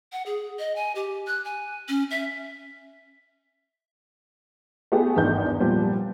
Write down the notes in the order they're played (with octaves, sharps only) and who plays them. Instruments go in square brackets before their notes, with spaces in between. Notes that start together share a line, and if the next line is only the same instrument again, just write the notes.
[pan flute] F#5
G#4
D#5
G#5
G4
F#6
G#5
C#4
E5
[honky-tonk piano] A3 B3 G4 G#4
G#1 E2 G2 D#3 B3 G6
A#2 F3 G3 B3